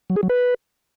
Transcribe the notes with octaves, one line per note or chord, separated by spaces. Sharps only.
F#3
G#4
F#3
B4